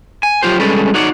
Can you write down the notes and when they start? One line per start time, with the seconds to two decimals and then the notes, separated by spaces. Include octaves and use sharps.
0.23 G#5
0.43 F#3 F4 G4 C5
0.60 G3 G#3 C#4 A4 B4
0.94 D#4 F#4 C#5 D5